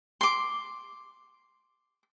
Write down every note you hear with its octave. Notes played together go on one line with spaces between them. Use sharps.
C6 D6